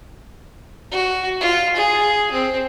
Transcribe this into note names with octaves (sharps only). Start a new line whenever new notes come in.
F#4
F4
G#4
C4